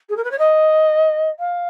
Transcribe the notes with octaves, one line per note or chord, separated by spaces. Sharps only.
G#4
A#4
B4
C#5
D#5
F5